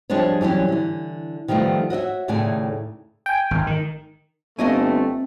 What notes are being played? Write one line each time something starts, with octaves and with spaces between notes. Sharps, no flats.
F3 G3 G#3 D4 C5 C#5
E3 F#3 G3 C#4
D3 E3
D#3 F3 G3 A3 B3
F#4 C#5 D#5 E5
D#2 A2 C#3 A3 D5 G#5
G5 G#5
G#1
D#3
G1 A3 A#3 C4 D#5 G#5